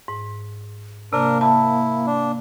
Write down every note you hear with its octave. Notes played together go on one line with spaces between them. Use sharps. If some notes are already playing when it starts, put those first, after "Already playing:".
G#2
C3 A#3 D4 A#4
E4 A5
D4